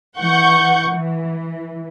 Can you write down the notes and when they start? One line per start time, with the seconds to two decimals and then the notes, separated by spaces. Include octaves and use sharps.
0.18 E3 F#5 C#6 G6
0.90 E3